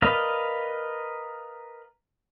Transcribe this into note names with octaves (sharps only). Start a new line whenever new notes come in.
A#4 B4 D5 D#5 F5